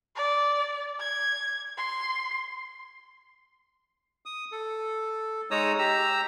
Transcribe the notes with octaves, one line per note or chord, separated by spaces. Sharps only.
D5
G#6
C6
D#6
A4
G#3 D#4 C#5 A#5 D#6 E6
G4 A#5 E6